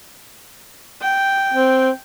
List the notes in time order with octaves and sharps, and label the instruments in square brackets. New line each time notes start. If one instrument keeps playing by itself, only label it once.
[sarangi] G5
[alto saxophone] C4